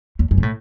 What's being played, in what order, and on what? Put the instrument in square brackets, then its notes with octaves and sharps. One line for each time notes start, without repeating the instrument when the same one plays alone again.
[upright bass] E2
F#2
C3
A2